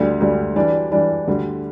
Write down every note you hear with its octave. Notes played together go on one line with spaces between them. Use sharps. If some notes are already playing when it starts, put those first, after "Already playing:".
Already playing: D2 D3 G3
D2 D3 G3
E3 G3 D4
E3 G3 D4
D2 D3 G3